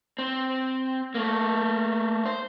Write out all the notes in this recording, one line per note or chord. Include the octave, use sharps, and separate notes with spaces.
C4
A3 A#3
C5